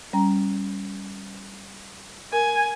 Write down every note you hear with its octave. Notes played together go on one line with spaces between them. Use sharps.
G3 C#4 A#5
A#4 G#5